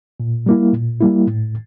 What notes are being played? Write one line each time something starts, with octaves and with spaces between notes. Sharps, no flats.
A#2
G3 A#3 E4
A#2
G3 A#3 E4
A2